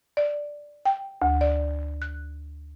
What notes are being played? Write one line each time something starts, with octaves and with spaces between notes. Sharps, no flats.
D5
G5
D2
D5
F#6